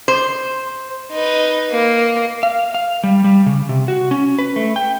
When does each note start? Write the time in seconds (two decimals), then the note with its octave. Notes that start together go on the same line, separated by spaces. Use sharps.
0.08 C5
1.12 D#4 B4
1.71 A#3
2.43 F5
2.74 F5
3.04 G3
3.24 G3
3.46 C#3
3.69 C3
3.88 F#4
4.11 C#4
4.39 B4
4.56 A3
4.76 G5